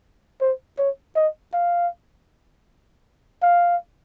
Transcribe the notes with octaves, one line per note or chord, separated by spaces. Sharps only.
C5
C#5
D#5
F5
F5